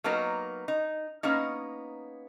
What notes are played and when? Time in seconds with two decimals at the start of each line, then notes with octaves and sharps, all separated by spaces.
0.04 F#3 A#3 B3 D#4 A#4
0.68 D#4
1.23 A#3 B3 C#4 D#4